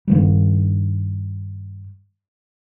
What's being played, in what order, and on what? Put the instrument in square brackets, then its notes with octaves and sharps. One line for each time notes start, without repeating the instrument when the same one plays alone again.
[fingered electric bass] G2 D#3 G3